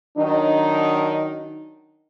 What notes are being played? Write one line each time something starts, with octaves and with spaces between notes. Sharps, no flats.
D#3 F#3 D4 D#4